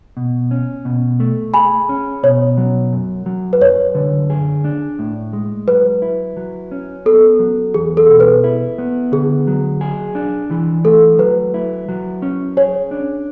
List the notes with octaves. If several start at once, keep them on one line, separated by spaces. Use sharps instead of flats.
B2
C#4
B2
A3
G#4 G#5 B5
C#4
B2 C#5
F#3
F#2
F#3
B4
F#2 C#5
D3
G#4
D4
A2
G#3
F#3 B4
E4
F#3
C#4
B3 A4
F#3
E2 G#4
A4
B2
B4
E4
B3
D3 G#4
F#3
G#4
D4
E3
A3 A4
F#3 B4
E4
F#3
C#4
G#4 C#5
D4